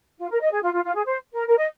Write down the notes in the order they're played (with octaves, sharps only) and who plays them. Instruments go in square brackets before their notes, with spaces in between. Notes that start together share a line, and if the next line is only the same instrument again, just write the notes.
[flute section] F4
A#4
D#5
G#4
F4
F4
F4
G#4
C5
A#4
A#4
D#5